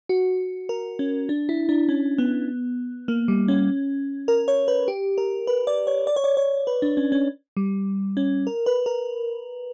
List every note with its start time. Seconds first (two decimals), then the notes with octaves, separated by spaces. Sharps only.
0.09 F#4
0.69 A#4
0.99 C#4
1.29 D4
1.49 E4
1.69 D4
1.89 C#4
2.18 B3
3.08 A#3
3.28 G3
3.48 C#4
4.28 A#4
4.48 C#5
4.68 B4
4.88 G4
5.18 A#4
5.47 B4
5.67 D5
5.87 C#5
6.07 D5
6.16 C#5
6.24 D5
6.37 C#5
6.67 B4
6.82 D4
6.97 C#4
7.12 C#4
7.57 G3
8.17 C#4
8.47 A#4
8.66 B4
8.86 A#4